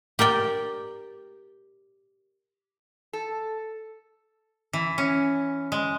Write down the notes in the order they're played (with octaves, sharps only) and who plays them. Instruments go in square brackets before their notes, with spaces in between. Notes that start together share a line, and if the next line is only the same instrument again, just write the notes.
[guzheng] G4 A#4 D5 G5
[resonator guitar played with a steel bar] A4
[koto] E3
C#4
G#3